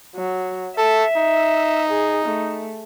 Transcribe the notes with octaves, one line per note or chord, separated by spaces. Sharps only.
F#3
A4 E5
D#4
G#4
A3